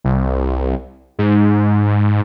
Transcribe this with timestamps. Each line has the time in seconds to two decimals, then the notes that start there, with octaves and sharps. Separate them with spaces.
0.04 C2
1.19 G#2